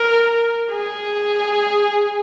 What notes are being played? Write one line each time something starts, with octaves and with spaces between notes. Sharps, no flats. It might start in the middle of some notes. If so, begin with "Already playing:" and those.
Already playing: A#4
G#4